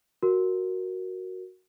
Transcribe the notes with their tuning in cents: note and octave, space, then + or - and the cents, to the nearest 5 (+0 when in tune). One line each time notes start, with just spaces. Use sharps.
F#4 +0 A#4 +0